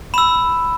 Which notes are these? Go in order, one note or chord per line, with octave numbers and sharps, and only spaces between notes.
B5 E6 E7